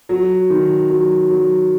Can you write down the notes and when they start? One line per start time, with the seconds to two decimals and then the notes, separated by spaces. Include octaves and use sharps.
0.09 F#3
0.50 D#3
0.90 F#3
1.30 F#3